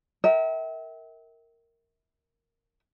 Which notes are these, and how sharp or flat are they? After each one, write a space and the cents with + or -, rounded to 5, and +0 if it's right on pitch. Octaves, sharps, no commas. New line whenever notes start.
A#4 -10 E5 -35 G5 -25